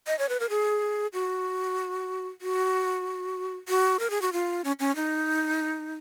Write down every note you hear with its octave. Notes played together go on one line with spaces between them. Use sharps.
D#5
C#5
B4
A#4
G#4
F#4
F#4
F#4
A#4
G#4
F#4
F4
C#4
C#4
D#4